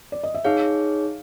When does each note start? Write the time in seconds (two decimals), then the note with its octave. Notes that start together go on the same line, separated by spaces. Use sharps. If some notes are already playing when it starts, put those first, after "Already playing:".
0.12 D5
0.24 D#5
0.35 E5
0.44 D#4 G#4 C#5 F5